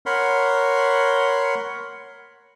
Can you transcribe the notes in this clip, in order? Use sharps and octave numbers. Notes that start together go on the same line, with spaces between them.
A#4 C#5 F#5 B5 C6